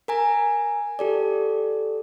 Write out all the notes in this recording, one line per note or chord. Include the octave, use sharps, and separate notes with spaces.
A#4 G#5 A#5
G4 A4 D5